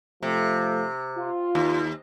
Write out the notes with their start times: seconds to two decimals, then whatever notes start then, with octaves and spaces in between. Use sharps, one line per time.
0.23 C3 F3 A3
1.17 F4
1.55 D#2